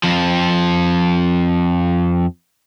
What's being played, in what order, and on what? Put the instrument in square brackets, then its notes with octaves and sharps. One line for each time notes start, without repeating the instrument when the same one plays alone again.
[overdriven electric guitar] F2 F3